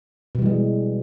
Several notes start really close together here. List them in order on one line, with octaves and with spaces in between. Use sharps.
B2 G3 E3 G#3